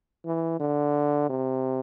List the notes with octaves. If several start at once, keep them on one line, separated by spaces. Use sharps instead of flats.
E3
D3
C3